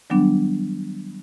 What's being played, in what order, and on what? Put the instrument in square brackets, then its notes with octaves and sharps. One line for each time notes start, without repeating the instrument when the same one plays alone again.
[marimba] D#3 F#3 G3 B3 D4